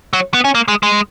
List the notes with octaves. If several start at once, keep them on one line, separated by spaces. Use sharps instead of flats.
F#3
B3
C#4
A#3
G#3
G#3